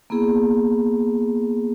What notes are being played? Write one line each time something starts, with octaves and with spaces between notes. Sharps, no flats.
A#3 B3 E4 G#4